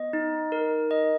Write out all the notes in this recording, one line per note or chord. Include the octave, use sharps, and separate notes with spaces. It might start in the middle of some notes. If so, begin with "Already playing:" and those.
Already playing: B3 D#5
D#4
A#4
D#5